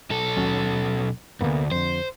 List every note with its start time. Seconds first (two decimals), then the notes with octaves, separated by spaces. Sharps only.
0.10 B1 A4
0.37 D#2 F#3 C#4
1.41 D2 G2 C3 A#3 B3
1.72 F2 D3 C5